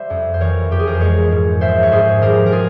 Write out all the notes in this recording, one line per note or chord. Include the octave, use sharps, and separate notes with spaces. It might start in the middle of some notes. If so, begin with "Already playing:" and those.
Already playing: G3 C5 E5
F2
C5
E3 A#4 C#5
F2 G4
G#4
A#4
C5
G#3 A#4 C#5
G#2
F3 C5 E5
C#5
G#2 G#4 C5
F3 G4 A#4
A#4
F4 G#4